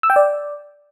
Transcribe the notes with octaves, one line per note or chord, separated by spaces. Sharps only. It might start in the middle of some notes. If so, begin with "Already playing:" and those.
E6
G5
D5